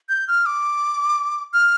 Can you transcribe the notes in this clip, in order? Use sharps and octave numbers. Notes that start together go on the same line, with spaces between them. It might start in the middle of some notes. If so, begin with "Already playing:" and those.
G6
F6
D6
F6